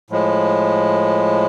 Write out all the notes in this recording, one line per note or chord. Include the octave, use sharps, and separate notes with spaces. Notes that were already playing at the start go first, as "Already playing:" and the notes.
A2 F3 G#3